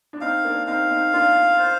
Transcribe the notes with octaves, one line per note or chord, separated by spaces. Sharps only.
D4
C4 D#4 F5
A#3 D4
C4 D#4 F5
C4 D#4
A#3 D4 F4
C5